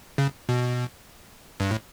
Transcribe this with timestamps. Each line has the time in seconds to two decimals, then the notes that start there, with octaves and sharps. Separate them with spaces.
0.18 C#3
0.49 B2
1.60 G2
1.71 A2